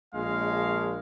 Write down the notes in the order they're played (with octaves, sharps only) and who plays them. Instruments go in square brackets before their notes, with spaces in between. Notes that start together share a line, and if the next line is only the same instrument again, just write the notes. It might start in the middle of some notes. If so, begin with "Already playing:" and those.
[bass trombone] A#1 [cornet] G#3 [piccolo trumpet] F5